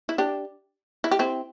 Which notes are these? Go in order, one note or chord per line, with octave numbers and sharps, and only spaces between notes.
E4
D4 G4
E4
G4
C4 E4